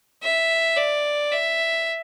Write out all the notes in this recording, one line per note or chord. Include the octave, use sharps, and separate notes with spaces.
E5
D5
E5